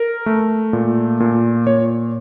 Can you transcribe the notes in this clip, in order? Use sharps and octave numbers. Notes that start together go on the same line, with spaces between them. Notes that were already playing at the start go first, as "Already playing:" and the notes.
Already playing: A#4
A3
A#2
A#2
A#2 C#5